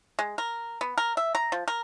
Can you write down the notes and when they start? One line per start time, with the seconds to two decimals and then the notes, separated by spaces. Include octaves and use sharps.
0.19 G#3
0.38 A#4
0.81 B3
0.98 A#4
1.17 E5
1.35 A#5
1.52 F3
1.68 A#4